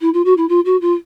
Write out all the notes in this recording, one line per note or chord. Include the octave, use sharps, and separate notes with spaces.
E4
F4
F#4
E4
F4
F#4
F4